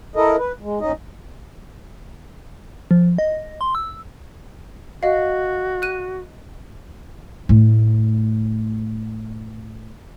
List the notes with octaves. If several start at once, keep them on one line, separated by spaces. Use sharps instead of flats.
E4 A4 A#4 D#5
B4
G#3
G#2 C#4 D#4 D#5
F3
D#5
C6
E6
F#4 D#5 F5
F#6 D#7
A2 A3